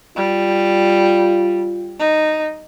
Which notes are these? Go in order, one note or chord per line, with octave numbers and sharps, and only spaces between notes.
G3 F4
D#4